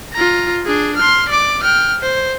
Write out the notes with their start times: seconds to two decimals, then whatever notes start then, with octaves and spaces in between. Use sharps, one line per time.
0.13 F4 A#5
0.66 D4 G#4
0.97 C6 F6
1.29 D5 D6
1.63 G5 F6
2.02 C5